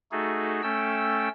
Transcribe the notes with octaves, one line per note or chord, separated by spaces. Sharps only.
A3 D#4 F#4 G#4 A4
A3 C#4 A4 G5 E6